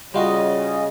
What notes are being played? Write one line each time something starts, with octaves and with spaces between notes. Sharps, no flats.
C#3 G3 F4 F#4 D#5